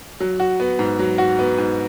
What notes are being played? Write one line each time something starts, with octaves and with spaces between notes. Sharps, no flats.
F#3
F#4
B3
G#2
F#3
F#4
B3
G#2